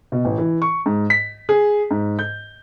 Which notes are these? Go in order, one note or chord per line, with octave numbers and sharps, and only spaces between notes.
B2
A1
E3
C#6
G#2
B6
G#4
G#2
G6